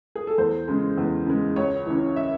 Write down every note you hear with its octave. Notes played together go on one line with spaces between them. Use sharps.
G#4
A4
E2 C5
C#3 G#3
E2
C#3 G#3
C#2 C#5
C#3 E3
E5